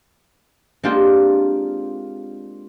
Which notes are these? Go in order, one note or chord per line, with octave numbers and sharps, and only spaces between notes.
G#3 A#3 C4 D4 F4 G4